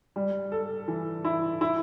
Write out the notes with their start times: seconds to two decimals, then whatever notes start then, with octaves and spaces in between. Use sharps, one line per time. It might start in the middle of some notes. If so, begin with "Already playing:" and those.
0.16 G3
0.52 A4
0.88 E3
1.25 E4
1.61 E4